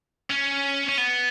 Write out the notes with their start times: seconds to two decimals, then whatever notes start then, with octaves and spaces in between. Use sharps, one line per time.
0.30 C#4
0.89 C#4
0.98 B3